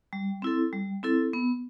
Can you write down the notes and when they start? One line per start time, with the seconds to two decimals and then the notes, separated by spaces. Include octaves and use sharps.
0.13 G3
0.42 C4 E4 A4
0.73 G3
1.03 C4 E4 A4
1.33 B3